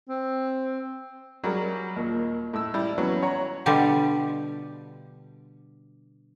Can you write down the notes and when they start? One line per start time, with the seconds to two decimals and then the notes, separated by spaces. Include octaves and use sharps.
0.09 C4
1.44 F#3 G3 G#4 A#4
1.96 D#2 A#2
2.53 A2 E6
2.74 G3 E4
2.98 E3 F#3 B3 C#4
3.23 C#5 F#5 A#5
3.66 B2 D3 G3 F4 G4